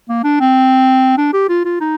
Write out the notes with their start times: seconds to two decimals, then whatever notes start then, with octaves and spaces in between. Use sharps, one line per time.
0.09 A#3
0.24 D4
0.40 C4
1.17 D4
1.33 G4
1.49 F4
1.65 F4
1.80 D#4